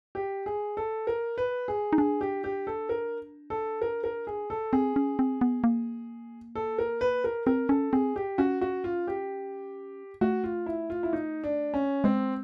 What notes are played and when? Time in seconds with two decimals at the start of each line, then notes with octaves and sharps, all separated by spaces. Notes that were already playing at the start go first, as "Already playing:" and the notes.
0.15 G4
0.46 G#4
0.77 A4
1.07 A#4
1.38 B4
1.68 G#4
1.93 D#4
1.98 D4 G#4
2.21 G4
2.44 G4
2.67 A4
2.89 A#4
3.50 A4
3.81 A#4
4.04 A#4
4.27 G#4
4.50 A4
4.73 C4 G#4
4.96 C#4
5.19 C4
5.41 B3
5.64 A#3
6.55 A4
6.78 A#4
7.01 B4
7.24 A#4
7.46 C4 A#4
7.69 C#4 A4
7.93 C4 G#4
8.16 G4
8.38 C#4 F#4
8.61 F#4
8.84 F4
9.07 G4
10.21 A3 F#4
10.44 F4
10.66 E4
10.90 F4
11.03 E4
11.13 D#4
11.44 D4
11.74 C#4
12.04 G#3 C4